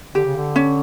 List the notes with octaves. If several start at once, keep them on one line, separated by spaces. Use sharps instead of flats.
D3 G4
C#3
D3
C#4